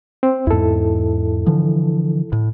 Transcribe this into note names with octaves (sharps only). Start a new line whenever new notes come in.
C4
E2 G#2 E4 A4
D3 E3 F3
A2